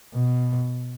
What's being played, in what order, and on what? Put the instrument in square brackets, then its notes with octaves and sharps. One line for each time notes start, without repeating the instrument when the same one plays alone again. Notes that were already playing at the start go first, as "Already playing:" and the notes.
[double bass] B2